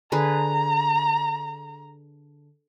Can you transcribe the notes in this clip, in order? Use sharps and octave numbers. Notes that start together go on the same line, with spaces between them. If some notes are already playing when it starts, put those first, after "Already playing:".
D3 G#4 B4 A#5